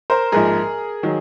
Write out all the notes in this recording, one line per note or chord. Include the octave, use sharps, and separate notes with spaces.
A#4 C5
A#1 G#2 F3 G#4 A#4
D#3 F#3